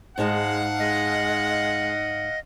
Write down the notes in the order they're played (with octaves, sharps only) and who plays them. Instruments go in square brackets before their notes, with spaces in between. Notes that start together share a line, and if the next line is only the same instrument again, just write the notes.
[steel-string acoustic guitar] G#2 D#4 A5 [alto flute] G#3 [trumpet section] F5 F#5
[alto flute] G#3 [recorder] D#5